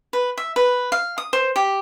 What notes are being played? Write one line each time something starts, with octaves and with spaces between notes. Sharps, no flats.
B4
E5
B4
F5
D#6
C5
G4